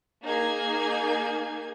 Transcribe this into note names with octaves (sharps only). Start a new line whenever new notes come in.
A#3 D#4 G#4 G#6